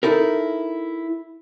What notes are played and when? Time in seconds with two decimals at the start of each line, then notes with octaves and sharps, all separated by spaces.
0.03 D#4 E4 A4 A#4